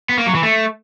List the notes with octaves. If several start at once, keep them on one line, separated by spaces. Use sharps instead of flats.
B3
A#3
F#3
E3
A3